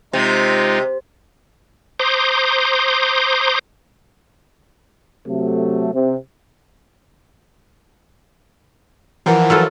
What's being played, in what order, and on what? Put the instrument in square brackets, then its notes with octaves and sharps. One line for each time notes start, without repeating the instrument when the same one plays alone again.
[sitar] C3 [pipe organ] G#3 D#4 F4
[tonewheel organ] C5 A#5 C6 D6 D#6 G6
[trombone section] C3 F#3 A3
C3
[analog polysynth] E3 F3 [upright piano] A#4 [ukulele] C5 D5 F#5
[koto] F#3 F4 A4